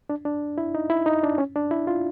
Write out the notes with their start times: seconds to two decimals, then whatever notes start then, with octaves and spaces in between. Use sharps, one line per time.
0.10 D4
0.25 D4
0.58 E4
0.75 D#4
0.90 E4
1.06 D#4
1.23 D4
1.38 C#4
1.55 D4
1.71 E4
1.87 F4